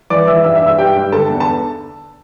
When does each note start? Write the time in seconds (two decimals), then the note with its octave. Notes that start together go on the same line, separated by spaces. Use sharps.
0.10 E3 D5 D6
0.27 E3 E5 E6
0.44 G2 E5 E6
0.55 E5 E6
0.62 G2
0.67 E5 E6
0.78 G2 G4 G5
0.96 G2
1.12 D3 A4 A5
1.30 E2
1.40 A5